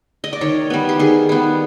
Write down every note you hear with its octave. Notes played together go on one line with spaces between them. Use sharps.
D#5
D5
D#3 C#5
G3 B3
G4
D#3 G#4
G3 B3